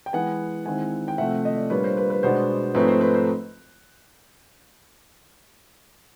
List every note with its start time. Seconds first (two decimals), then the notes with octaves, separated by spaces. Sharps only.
0.06 G5
0.13 E3 G#3 B3 F#5 G#5
0.66 D#3 G#3 C4 E4 F#5 G#5
1.08 G5
1.18 C3 F3 A3 C4 E5 F#5
1.45 D#5
1.57 D5
1.70 A#2 G3 A#3 D4 F4 B4 C#5
1.84 C5
1.97 B4
2.10 B4
2.23 B2 G#3 B3 D4 C5
2.74 G#2 F3 A3 C4 D#4 B4 C#5
2.88 C5
3.01 B4
3.14 C5